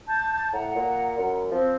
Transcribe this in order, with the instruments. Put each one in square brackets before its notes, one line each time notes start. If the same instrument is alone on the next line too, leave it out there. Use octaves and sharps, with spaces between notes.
[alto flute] A5 [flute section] G6
[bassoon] A2 [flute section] F#5 [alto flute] A#5
[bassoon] A#2
F#2
[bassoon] F3 [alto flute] C4